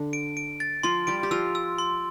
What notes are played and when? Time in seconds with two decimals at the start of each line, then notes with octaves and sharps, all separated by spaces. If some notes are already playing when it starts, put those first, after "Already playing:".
Already playing: D3 D4
0.13 D7
0.37 D7
0.60 A6
0.83 F3 F4 C6
1.07 G3 G4 D7
1.23 G4
1.31 F3 F4 E6
1.55 E6
1.78 C6